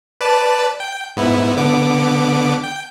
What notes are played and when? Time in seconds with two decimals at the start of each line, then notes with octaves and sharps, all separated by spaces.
0.21 B4 D5 A5
0.80 G5
1.17 G#2 B3 E4
1.57 D3 B3 D6
2.64 G5